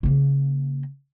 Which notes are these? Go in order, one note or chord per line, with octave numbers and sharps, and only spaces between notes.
C#3 A#3